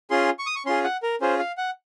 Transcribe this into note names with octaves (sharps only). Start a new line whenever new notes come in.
C#4 F4 G#4 C6
C#6
D#6
C#6
C#4 F4 G#4 C6
F#5
A#4
C#4 F4 G#4 C5
F5
F#5